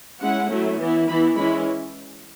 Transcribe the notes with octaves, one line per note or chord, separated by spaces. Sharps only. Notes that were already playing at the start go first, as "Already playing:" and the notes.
G#3 C#4 E4 F#5
F#3 A3 C#4 E4
E3 B3 E4
E3 B3 E4 B5
E3 G#3 C#4 E4 B5